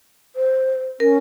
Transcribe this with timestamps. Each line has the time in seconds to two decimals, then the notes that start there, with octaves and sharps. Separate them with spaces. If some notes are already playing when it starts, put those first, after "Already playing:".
0.36 C5
1.00 C#4 A#4